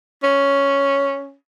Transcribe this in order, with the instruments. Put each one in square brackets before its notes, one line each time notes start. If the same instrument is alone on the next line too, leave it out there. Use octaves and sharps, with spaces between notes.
[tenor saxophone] C#4